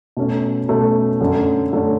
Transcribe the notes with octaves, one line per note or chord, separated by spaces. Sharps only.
B2 A3 C#4
B2 A3 C#4
F#2 D3 A3 C#4
F#2 D3 A3 C#4